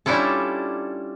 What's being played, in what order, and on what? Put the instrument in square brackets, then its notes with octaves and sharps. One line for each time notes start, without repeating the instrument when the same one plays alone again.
[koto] G3 C#4 D4 E4 F4 A4